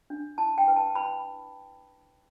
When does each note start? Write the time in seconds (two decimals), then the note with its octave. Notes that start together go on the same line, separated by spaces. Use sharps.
0.10 D4
0.38 E4 A5
0.58 G5
0.68 B4
0.76 A5
0.95 B4 B5